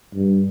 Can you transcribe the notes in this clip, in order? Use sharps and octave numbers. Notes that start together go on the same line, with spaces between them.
G2